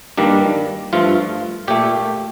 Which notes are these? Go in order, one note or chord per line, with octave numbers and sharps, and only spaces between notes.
G2 D#3 G3 A#3 D4
G2 F3 A3 F4
A#2 A3 G4